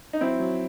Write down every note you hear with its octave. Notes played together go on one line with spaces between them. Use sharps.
D#4
F#3 C4 E4
F#3